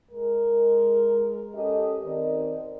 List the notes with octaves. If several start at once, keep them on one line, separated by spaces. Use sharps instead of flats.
G#3 A#4
C#4 G4 A4 D#5
D#3 C4 D#4 A#4 D5 D#5